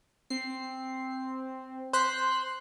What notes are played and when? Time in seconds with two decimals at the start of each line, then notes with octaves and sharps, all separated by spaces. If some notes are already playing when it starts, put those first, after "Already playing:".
0.30 C4 C7
1.93 C5 C6 F#6 B6